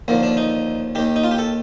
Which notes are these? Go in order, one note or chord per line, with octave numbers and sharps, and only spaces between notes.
D#2 D3 F3 A#3
D4
D#4
D#2 D#3 G4
D#4
F4
G4
A4